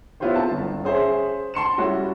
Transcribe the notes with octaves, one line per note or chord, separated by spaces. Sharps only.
B3 E4 F4 G4 C5 C#5
C4 A5
G1
C#4 G#4 C5 C#5 E5
A5 C6 C#7 E7
G3 C#4 E4 F#4